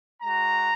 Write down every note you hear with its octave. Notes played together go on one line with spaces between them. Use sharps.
G#3 F#4 A#5